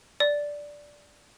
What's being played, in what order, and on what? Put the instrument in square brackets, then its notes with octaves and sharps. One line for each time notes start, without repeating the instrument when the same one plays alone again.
[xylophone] D5